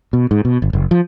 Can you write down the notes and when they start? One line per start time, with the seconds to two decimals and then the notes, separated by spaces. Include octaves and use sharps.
0.13 B2
0.31 G#2
0.45 B2
0.62 G1
0.73 F#1
0.91 F3